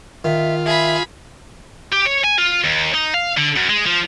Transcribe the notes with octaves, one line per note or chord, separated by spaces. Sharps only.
D#3 F4 E5
G#4 E5 B5
G4
C#5
G#5
F4
D#2
D#4
F5
D3
F#2
G#3
F3